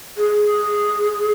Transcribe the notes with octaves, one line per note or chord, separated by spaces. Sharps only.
G#4